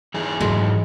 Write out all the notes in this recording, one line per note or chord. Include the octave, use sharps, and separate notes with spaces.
E3 D#4 G#4
G#2 D#3 F#3 G#3